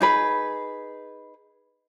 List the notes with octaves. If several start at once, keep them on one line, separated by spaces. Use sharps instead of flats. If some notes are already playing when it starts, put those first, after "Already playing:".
D#4 G#4 B4